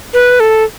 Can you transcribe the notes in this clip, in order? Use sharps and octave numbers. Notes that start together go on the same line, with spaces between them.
B4
A4